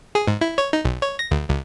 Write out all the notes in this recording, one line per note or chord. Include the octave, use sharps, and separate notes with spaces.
G#4
G#2
E4
C#5
D#4
B1
C#5
A#6
D2
C#2